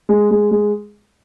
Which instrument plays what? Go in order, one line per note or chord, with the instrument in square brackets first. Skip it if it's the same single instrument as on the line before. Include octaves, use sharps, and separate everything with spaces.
[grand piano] G#3
G#3
G#3